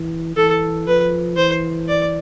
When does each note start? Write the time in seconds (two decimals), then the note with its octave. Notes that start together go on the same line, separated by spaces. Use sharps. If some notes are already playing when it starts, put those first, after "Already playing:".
Already playing: E3
0.36 E3 A4
0.87 F3 B4
1.37 E3 C5
1.88 D5